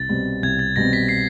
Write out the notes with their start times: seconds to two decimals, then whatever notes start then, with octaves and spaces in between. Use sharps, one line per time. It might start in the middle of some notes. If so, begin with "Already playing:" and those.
Already playing: C2 A6
0.09 B2 G3 C4
0.43 C2 G#6
0.59 A6
0.76 B2 G3 C4 A#6
0.93 B6
1.09 C7